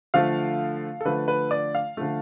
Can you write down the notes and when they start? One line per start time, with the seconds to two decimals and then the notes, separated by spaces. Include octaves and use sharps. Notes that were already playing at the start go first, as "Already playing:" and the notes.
0.14 D3 F3 A3 F5
1.01 A4
1.05 D3 F3 A3 B4
1.28 B4
1.51 D5
1.75 F5
1.97 D3 F3 A3